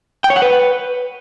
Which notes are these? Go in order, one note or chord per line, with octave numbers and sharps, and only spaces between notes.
G5
C#5
F#5
B4